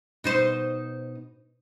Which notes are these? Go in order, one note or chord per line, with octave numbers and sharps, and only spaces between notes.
B2 D#4 C5